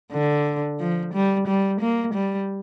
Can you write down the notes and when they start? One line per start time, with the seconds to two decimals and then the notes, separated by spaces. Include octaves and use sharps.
0.12 D3
0.79 F3
1.13 G3
1.47 G3
1.81 A#3
2.14 G3